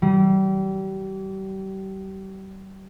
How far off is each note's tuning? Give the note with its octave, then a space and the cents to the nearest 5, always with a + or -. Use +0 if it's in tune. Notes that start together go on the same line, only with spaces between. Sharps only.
G3 -35